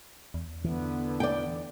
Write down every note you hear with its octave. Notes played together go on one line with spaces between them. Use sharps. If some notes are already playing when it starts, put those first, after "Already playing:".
E2
D3 E3 B3
D5 G5